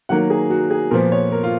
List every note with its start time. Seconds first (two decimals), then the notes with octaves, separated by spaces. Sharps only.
0.09 D#3 F#3 A#3 F#5
0.30 G#4
0.50 F#4
0.71 G#4
0.91 A#2 F3 B3 A#4
1.12 C#5
1.32 A#4
1.43 F4